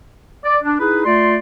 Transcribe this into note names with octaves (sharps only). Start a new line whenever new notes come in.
D5
D4
D#4 E4 G#4 B4
A3 F4 D5 C6